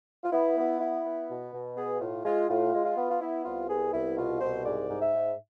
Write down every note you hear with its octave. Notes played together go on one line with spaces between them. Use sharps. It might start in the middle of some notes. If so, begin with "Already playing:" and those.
F4
B3 E4
B3
E4
B3
B2
B2
B3 G#4
A2 F4
G#3 F4
A2 F4
G#3
F4
B3
F4
B3 E4
C2 F4
B3 G#4
C2 E4
B2 F4
C2 C5
G#2 D5
G#2
E5
G#2